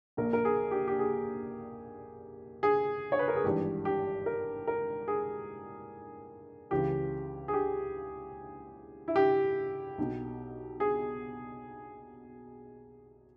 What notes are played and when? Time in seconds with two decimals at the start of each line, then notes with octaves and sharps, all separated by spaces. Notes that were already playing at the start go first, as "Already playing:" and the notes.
0.17 A#1 A#2 A#4
0.33 A#4
0.45 G#4
0.71 G4
0.88 G4
0.99 G#4
2.63 G#4
3.12 C#5
3.19 B4
3.28 A#4
3.36 G#4
3.44 G#1 G2 E3 G4
3.85 G4
4.26 A#4
4.67 A#4
5.08 G#4
6.71 C#2 C#3 E3 G4
7.48 G#4
7.53 G4
9.08 E4
9.16 G4
9.98 B1 B2
10.80 G#4